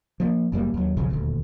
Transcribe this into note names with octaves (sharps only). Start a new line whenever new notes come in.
F3 A#3
F#1 F#2 G3 A#3
D#2 F#3
E1 B1 C#3 F3
D#1 D2